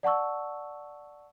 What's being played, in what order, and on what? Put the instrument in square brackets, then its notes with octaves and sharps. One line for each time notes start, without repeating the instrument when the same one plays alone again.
[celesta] D5 F#5 A5 C#6 E6